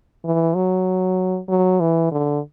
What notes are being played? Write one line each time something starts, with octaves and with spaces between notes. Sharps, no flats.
E3
F#3
F#3
E3
D3